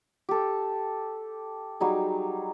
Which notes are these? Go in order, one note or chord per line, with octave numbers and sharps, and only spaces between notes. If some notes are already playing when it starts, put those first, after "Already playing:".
G4 A4
F#3 G3 D#4 G#4